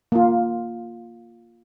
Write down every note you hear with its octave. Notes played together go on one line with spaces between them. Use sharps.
A#3 F4